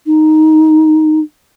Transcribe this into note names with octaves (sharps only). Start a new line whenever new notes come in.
D#4